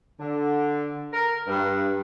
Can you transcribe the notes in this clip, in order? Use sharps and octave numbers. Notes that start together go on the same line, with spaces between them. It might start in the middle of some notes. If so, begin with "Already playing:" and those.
D3
A#4
G2